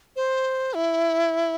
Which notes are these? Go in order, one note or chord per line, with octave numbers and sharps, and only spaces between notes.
C5
E4